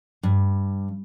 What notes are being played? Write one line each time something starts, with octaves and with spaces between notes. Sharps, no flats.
G2